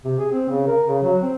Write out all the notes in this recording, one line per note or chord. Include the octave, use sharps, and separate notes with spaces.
C3
G#4
C4
C#3
A#4
C#3
F#3
C4